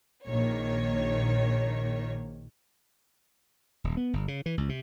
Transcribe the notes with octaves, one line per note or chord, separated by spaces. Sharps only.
A#1 D#3 A#3 C#5
D#1
B3
G1
C#3
E3
C#2
C3